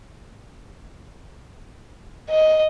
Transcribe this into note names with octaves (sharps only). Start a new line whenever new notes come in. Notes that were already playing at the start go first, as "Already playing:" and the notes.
D#5